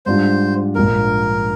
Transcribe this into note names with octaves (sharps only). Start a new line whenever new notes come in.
G#2 G3 D4 F4 C5
A#1 G#2 F3 A#3 A#4